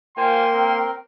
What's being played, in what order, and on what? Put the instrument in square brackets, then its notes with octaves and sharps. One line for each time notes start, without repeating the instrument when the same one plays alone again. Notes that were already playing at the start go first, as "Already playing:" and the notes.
[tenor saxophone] A#3 [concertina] F4 C5 G#5 [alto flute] G5 [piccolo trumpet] C6
[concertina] C4 A#4